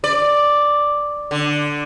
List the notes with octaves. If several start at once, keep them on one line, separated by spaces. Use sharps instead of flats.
D5
D3